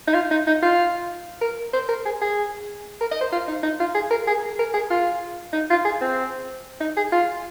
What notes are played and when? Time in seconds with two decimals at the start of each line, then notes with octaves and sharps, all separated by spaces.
0.08 D#4
0.15 F4
0.31 D#4
0.47 D#4
0.63 F4
1.42 A#4
1.73 C5
1.89 A#4
2.06 G#4
2.22 G#4
3.01 A#4
3.12 D#5
3.21 C5
3.32 F4
3.48 D#4
3.63 D#4
3.80 F4
3.95 G#4
4.11 A#4
4.28 G#4
4.59 A#4
4.74 G#4
4.91 F4
5.53 D#4
5.70 F4
5.85 G#4
6.01 C4
6.81 D#4
6.97 G#4
7.12 F4